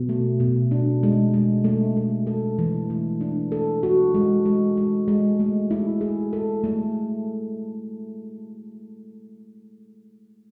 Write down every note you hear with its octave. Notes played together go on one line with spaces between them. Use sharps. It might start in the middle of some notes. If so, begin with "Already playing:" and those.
Already playing: B2
A3
B2
D4
G#3
G#3
A3
A3
A4
E3
A3
D4
A4
F#4
G#3
G#3
G#3
G#3
A3
E4
G#4
A4
A3